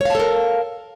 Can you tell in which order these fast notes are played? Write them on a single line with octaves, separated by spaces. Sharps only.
C#5 F5 A5 A4 A#4